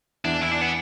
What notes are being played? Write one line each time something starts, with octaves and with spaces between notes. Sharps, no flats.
E2 E3 D4
E4
D4
B3